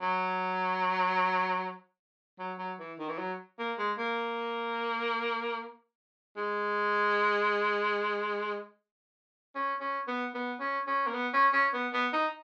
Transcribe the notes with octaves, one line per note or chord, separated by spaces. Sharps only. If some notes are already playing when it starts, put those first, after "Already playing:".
F#3
F#3
F#3
E3
D#3
E3
F#3
A#3
G#3
A#3
G#3
C#4
C#4
B3
B3
C#4
C#4
A#3
B3
C#4
C#4
B3
B3
D#4